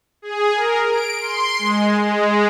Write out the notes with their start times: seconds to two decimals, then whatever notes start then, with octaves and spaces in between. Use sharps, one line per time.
0.22 G#4
0.56 A#4
0.90 D7
1.20 C6
1.59 G#3
2.05 G#3